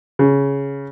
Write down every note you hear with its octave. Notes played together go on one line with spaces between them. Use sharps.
C#3